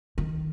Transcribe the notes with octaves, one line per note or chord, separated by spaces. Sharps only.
D#3